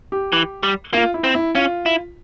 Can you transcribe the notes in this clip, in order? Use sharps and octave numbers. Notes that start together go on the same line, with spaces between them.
G4
E3
G3
A#3 F4
E4
C4
E4
C#4 F4
E4